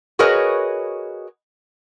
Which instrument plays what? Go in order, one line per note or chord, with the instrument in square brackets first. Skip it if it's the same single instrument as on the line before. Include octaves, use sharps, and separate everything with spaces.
[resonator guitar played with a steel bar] F#4 G#4 A#4 B4 C#5 D#5